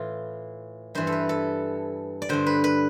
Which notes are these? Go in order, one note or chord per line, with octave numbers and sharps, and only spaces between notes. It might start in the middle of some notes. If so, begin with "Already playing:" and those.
Already playing: A2 E3 F4
G2 E3 C5
A4
B4
A4
D5
G2 D3 C5
B4
B4